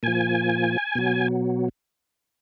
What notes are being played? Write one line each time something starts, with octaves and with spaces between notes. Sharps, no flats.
A#2 F3 G#5
B2 F#3